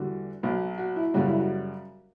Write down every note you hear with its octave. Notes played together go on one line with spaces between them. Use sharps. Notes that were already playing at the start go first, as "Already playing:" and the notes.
Already playing: E2 D3 G3 F#4
B1 B2 F#3
F#4
E4
F#2 C#3 G3 F#4
E4
F#4